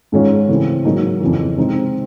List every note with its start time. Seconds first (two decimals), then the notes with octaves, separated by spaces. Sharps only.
0.12 G#2 D#3 G#3 C#4 F4
0.49 C#3 E3 A3 C4
0.85 G#2 D#3 F#3 A#3 D#4
1.21 F2 C#3 E3
1.57 C3 D#3 G#3 C4 D#4